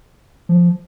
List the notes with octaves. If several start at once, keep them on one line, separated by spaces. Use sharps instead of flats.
F3